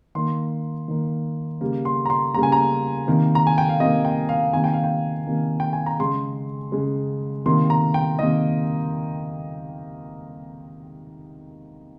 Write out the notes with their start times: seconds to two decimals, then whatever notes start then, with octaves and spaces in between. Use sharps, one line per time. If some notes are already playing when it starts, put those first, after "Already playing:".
0.15 D#3 A#3 C6
0.88 D#3 A#3
1.61 C#3 G3 A#3
1.85 C6
2.06 A#5
2.10 C6
2.34 C#3 G3 A#3 A#5
2.43 G#5
2.52 A#5
3.07 C3 D#3 A#3
3.35 A#5
3.47 G#5
3.58 G5
3.69 F5
3.80 C3 D#3 A#3 D#5
4.05 G5
4.29 F5
4.53 C3 D#3 A#3 G#5
4.64 G5
4.73 F5
4.84 G5
5.26 C3 D#3 A#3
5.60 G5
5.73 G#5
5.86 A#5
6.00 C#3 G#3 C6
6.72 C#3 G#3
7.46 C3 D#3 A#3 C6
7.70 A#5
7.94 G5
8.19 C3 D#3 A#3 D#5